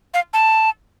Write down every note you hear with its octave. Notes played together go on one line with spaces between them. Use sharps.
F5
A5